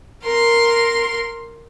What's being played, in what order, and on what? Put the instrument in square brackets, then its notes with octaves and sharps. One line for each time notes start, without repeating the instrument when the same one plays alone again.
[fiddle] A#4 C6